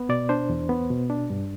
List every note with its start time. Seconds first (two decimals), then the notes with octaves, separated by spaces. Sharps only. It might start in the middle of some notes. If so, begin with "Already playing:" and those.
Already playing: B3
0.09 B2 D5
0.29 D4 C5
0.49 E2
0.69 B3
0.90 B2
1.10 D4
1.30 G2